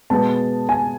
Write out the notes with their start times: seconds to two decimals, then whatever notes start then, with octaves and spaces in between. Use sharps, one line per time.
0.10 B2 G#3 B3 A5
0.69 G#5